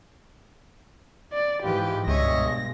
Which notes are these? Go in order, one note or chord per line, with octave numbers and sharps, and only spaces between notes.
D5
G#2 E3 F4 G4 B4
C#2 G2 B2 G#3 C#5 D#5 E5 A#6